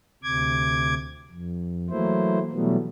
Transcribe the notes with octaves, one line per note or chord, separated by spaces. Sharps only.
D2 C3 D6 G#6
F2
E3 F#3 A3 A#3 E4 C5
B2 E3 F#3 G3 A3 B3